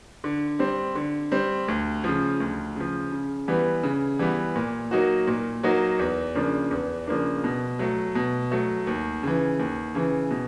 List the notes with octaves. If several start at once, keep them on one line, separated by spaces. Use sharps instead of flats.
D3
G3 C4
D3
G3 C4
D2
C#3 F3
D2
C#3 F3
C#3
E3 G3 B3
C#3
E3 G3 B3
A#2
F#3 A#3 D#4 F#4
A#2
F#3 A#3 D#4 F#4
E2
C#3 F3 A#3 D4
E2
C#3 F3 A#3 D4
B2
F#3 A3
B2
F#3 A3
D#2
C#3 E3
D#2
C#3 E3
B2